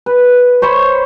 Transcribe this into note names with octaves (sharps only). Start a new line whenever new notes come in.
B4
C5 C#5 B5